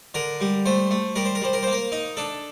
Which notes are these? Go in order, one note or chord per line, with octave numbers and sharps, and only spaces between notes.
D3 A#4
G3
A3 C5
A3
G3 A#4
C5
A#4
G3 C5
A#4
A#3 C5
A#4
D#4
D4 A4